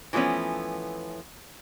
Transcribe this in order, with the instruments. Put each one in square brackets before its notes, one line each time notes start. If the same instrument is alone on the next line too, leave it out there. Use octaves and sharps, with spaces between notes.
[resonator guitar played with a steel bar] E3 F3 A3 B3 C#4